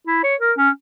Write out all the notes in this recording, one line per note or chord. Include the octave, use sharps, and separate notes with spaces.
E4
C#5
A#4
C#4